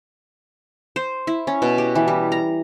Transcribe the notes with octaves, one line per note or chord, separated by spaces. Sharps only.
C5
E4
C#4
B2
G4
E3
G3
A#5